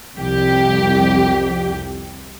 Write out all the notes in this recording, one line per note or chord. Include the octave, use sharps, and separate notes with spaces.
C2 F2 G4